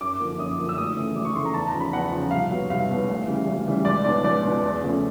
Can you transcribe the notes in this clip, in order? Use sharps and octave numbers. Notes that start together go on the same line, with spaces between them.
F#2 D6
D3 F3 A#3
F#2 D#6
D3 F3 A#3
E6
D2 D#6
C#3 E3 A3
D2 D6
C#6
C#3 E3 A3 C6
A#5
E2 A5
A#5
C#3 F3
B5
E2 F#5
C#3 F3
C2 F5
B2 F#3 B3
C2 F5
B2 F#3 B3
D2
C#3 E3 G3
D2
C#3 E3 G3
C#2 D5
B2 F#3 B3 D4 D5
C#2 D5
B2 F#3 B3 D4
E2
C#3 F3 A3 C#4